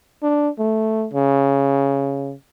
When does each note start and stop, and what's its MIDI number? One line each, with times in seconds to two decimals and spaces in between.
0.23 0.49 62
0.59 1.07 57
1.13 2.33 49